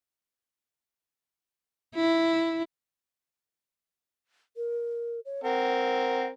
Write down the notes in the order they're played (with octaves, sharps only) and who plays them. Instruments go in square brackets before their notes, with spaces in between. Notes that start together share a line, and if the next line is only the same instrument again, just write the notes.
[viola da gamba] E4
[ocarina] A#4
C#5
[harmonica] C4 A#4 [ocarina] F#5